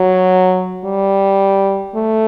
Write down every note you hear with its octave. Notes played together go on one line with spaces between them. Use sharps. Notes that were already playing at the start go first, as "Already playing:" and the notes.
Already playing: F#3
G3
A3